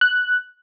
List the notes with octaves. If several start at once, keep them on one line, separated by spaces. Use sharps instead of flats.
F#6